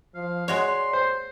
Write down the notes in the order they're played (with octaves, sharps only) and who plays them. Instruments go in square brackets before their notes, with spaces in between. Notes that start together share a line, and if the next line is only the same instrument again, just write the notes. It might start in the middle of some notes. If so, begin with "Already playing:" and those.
[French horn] F3 [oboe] F5
[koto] G#3 F#4 C#5 [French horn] D5 [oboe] C6
[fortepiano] C5